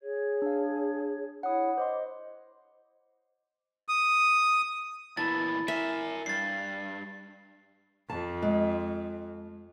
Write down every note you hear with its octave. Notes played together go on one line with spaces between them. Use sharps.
G#4 C#5 G#6
D4 F5
E4 C#5 F#5 B5 D#6
C5 D#5 C6 D6
D#6
A#2 E3 B3 E4 A5 A6
A#4 E5 G#5
G2 A6 C7
F2 A5
G#3